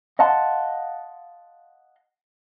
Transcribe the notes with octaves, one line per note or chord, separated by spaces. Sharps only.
D#5 F5 F#5 A5 C6